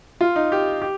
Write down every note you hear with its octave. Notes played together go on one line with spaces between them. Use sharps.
F4
D#4
G4
G4